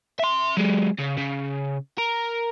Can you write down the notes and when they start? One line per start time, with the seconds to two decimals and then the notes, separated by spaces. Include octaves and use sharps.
0.19 E5 C6
0.57 F#3 G#3
0.98 C#3
1.17 C#3
1.98 A#4